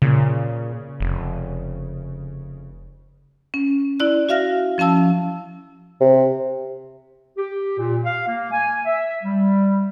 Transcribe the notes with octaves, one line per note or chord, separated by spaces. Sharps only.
A#2 C#3
F1
C#4
E4 D5 F#6
F#4 E5 F5 F6 A#6
F3 C#4 F5 A5 E6
C3
G4
A#2
F5
A#3
G#5
E5
G3